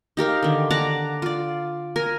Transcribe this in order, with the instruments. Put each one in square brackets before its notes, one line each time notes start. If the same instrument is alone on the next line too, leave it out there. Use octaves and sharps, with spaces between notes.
[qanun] D#4 G4 A#4 F5
D3 D#3
D5 F#5 A5 A#5
F4 D5
A#4 G#5